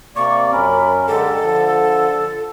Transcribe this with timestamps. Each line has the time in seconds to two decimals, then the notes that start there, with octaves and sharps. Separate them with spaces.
0.16 C3 A#3 D5 C#6
0.53 F#2 C#4 A#4 B5
1.08 D3 G#3 G4 A4
1.42 D3 F3